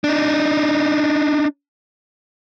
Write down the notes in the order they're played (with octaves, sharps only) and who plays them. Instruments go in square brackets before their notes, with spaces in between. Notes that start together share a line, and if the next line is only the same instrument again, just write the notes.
[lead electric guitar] D4 D#4